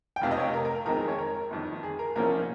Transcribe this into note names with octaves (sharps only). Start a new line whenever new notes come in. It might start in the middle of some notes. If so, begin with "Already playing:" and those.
G5
F1 F2 C3 F5
D#5
C#5
A#4
A#4
A#4
F2 D#3 G#3 C4 A#4
A#4
C#5
A#4
G1 F2 D#3
G#4
A#4
C2 A#2 F3 A#3 C#4 A#4